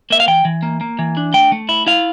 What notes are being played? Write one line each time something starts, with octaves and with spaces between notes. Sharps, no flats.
A#3 E5
F5
E3 G5
E3
A#3
A#3
E3
D4
A3 G5
A3
E4
E4 F5